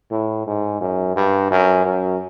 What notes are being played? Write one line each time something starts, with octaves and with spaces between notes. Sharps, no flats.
A2
G#2
F#2
G2
F#2
F#2